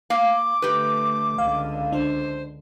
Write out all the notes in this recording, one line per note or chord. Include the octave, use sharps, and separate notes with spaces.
A#3 F5 D6
D3 A3 G4 B4
C#2 D3 F5
D4 C5